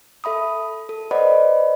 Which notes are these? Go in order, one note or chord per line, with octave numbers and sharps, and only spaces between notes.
A4 E5 B5 D#6
A4
B4 C5 D5 D#5 F#5 B5